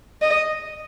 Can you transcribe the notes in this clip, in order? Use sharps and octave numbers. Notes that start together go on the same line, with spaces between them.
D#5